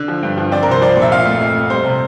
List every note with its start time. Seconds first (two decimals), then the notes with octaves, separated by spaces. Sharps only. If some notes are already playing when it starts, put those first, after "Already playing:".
Already playing: D3
0.08 F3
0.23 G2
0.38 F3
0.52 C4 D5
0.63 A#4
0.68 C2 C5
0.82 F3 D5
0.97 A#2
1.02 E5
1.12 F2 F5
1.26 A3
1.41 F2
1.56 F2
1.70 G3 C5
1.85 C3